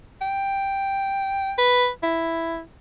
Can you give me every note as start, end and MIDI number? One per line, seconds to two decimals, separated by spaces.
0.21 1.53 79
1.58 1.89 71
2.03 2.61 64